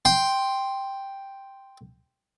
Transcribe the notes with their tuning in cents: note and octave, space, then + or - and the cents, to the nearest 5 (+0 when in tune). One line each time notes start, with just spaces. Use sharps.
G5 +0 C6 +0